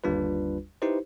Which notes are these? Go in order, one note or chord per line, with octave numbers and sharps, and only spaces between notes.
G1 D#2 G3 D4 F4 B4
D#4 E4 G4 B4 C5